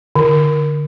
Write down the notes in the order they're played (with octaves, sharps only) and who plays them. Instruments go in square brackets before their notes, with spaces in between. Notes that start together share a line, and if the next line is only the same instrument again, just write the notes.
[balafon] D3